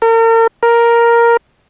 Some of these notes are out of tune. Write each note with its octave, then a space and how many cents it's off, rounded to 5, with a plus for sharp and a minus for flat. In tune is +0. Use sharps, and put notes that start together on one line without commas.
A#4 -40
A#4 +5